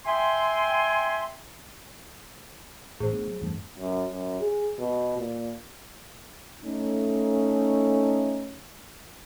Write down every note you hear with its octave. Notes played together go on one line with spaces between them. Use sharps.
E5 G5 G#5 C6
A1 A2 G#4 C5
A3 B3 D4
F#3
E2 G2 A3
F#2
F#2
G#4
B2
A#2
A3 C#4 D#4